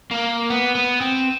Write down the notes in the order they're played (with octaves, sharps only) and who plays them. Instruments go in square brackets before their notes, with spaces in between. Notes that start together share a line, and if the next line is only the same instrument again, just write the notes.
[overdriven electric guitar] A#3
B3
B3
C4